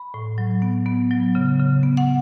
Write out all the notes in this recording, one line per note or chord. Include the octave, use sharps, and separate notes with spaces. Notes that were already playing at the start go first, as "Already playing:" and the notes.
Already playing: B5
A2
F#3
B3
B3
F#3
C#3
C#3
B3
F#5